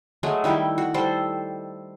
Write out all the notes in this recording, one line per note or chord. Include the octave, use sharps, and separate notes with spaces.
F#3 G#3 A3
D#3 G3 E4 G4
F#4
G3 A4 C5